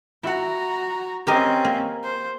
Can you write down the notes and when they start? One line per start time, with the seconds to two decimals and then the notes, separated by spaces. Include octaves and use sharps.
0.23 E4 F#4 F#5 A#5
1.27 C4 C#4 G4 A#4 D#5
1.65 A#3
2.04 C5